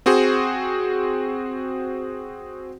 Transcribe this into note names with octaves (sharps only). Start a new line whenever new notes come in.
C4 F#4 G#4 C5